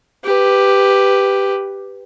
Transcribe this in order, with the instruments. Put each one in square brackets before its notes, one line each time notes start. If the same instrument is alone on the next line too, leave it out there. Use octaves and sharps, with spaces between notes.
[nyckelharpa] G4 B4